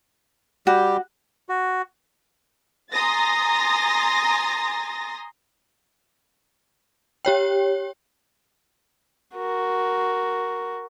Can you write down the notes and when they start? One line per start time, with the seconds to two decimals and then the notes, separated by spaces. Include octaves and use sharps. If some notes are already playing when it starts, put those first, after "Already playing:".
0.67 G3 F#4 G4
1.49 F#4
2.92 G#5 A#5 C6 D#6 A6 A#6
7.25 G4 C#5 G5
9.35 F#4 A#4